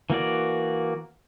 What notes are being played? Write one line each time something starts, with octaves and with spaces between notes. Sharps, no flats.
E3 A#3 F#4 D5